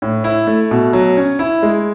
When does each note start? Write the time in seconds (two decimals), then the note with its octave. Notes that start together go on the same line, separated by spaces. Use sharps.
0.02 A2
0.24 E4
0.47 A3
0.71 B2
0.93 F#3
1.17 C#4
1.39 E4
1.63 G#3